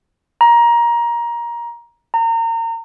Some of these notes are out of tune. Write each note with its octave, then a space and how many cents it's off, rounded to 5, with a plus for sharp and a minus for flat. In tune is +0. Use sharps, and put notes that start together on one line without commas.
A#5 +20
A#5 -30